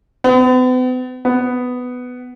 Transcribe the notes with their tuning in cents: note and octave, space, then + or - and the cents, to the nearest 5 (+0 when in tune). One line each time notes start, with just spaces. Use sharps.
B3 +45
B3 +10